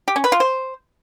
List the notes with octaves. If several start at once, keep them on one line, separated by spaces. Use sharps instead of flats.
G4
C#4
B4
F4
C5